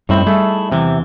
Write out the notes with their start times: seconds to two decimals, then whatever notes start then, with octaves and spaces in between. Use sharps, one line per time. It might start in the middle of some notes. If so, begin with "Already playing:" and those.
0.09 F#2 A2 G3 C4 D#4 E4
0.26 G3 A3 G#4 A4
0.72 E2 C3 E3